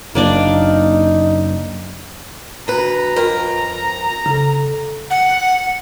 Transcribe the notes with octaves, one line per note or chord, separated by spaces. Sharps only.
F#1 A#3 D4 D#4 D5
D2 B4 A#5
F2 A#4
C#3 A4
F#5